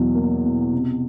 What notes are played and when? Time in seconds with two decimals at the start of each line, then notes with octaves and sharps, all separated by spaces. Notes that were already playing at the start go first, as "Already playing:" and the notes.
Already playing: E2 B2 F#3
0.15 A#3
0.44 B2
0.72 C3